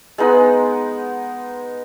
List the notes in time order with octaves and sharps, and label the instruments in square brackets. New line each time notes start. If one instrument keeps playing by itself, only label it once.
[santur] G#3 B3 D#4 F#5